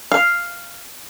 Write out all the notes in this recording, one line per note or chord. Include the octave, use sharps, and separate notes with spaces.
F5